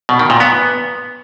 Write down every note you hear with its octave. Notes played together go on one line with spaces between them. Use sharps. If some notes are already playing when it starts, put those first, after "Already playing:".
B2
D#3
A#2
B3